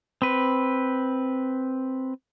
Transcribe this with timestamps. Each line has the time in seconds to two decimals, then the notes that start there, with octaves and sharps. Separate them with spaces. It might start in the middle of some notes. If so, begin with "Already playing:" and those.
0.22 C4 B4